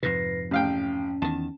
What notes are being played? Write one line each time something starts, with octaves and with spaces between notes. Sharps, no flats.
F2 G#2 C3 B4 A#6 C7
A1 C#4 F5 G5
E2 D#3 A5